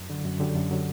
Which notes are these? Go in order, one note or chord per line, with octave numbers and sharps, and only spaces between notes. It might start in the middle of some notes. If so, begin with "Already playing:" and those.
Already playing: F#2
D3 F#3
F#2 F#4
D3 F#3 G4
F#2 A4
D3 F#3